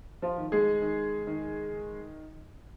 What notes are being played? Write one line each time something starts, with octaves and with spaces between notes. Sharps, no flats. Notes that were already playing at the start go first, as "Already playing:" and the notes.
F3 F4
D#3
G#3 G#4
D#3
D#3